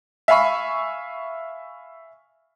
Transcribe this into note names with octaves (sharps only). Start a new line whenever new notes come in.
E5 F5 G#5 B5 C#6